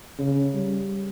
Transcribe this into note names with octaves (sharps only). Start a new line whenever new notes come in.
C#3
G3